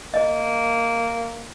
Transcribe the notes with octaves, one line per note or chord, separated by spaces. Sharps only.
A#3 D#5